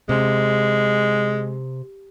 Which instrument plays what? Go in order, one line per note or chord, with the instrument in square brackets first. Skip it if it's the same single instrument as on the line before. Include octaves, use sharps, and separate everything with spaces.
[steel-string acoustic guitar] C3 [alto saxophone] G#3